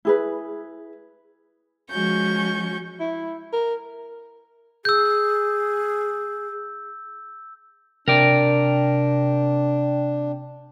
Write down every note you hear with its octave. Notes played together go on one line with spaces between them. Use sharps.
E4 G#4 B4
F3 G#3 C#4 F#4 C#6 G6
E4
A#4
G#4 E6 G6
C3 D4 A#4 D5 G5